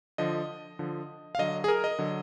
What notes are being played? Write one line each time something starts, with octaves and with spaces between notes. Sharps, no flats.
D3 F3 D#5
D3 F3
F5
D3 F#3 D#5
G#4
A#4
D#5
D3 F#3